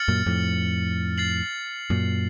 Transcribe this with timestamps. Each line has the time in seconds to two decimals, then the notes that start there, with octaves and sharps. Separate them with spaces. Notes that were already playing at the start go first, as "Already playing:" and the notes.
Already playing: F6 A6 C#7 F#7
0.08 F#2 A#2
0.26 F2 A2
1.18 A6 C7 F#7
1.90 F#2 A#2